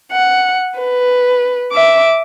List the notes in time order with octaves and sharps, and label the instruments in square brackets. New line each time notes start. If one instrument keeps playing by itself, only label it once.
[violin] F#5
B4
E5 D6